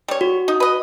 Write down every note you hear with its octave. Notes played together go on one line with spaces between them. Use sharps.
G3 C#5
F#4
D#4
B4 D#5